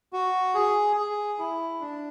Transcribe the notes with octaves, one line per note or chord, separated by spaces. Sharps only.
F#4
G#4
G#4
E4
D4